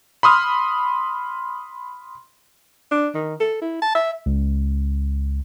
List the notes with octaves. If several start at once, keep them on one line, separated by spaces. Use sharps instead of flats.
B5 C6 D#6 F6
D4
D#3
A4
E4
A5
E5
C#2